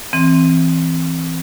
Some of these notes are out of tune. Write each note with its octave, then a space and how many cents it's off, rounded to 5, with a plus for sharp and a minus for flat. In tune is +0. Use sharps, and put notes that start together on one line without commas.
E3 +0 C4 +5